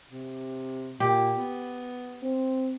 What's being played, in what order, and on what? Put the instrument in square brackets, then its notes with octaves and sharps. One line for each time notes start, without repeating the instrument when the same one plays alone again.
[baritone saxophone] C3
[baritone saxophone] A#2 [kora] G4
[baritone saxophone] B3
[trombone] C4